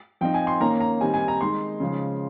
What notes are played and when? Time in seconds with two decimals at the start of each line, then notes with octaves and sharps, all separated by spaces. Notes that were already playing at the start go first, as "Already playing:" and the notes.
0.21 F3 C4 D#4 G5
0.34 G#5
0.47 C6
0.60 D#3 A#3 C#4 A#5
0.81 A#5
1.01 D#3 G3 C4 D#4 G#5
1.14 G#5
1.28 A#5
1.40 D#3 G#3 D#4 C6
1.80 C#3 F3 G#3